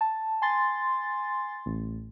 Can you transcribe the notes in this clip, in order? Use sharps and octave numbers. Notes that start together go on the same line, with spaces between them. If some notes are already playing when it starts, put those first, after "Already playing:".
A5
G#5 C6 A6
A1